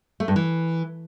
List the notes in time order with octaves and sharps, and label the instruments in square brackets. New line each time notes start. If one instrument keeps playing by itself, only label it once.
[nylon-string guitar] A3
G2
E3